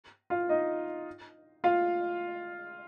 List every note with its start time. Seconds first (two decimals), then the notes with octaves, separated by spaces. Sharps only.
0.30 F4 F5
0.49 D#4 D#5
1.64 F4 F5